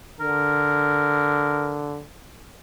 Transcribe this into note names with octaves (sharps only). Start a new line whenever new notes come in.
D3 A#4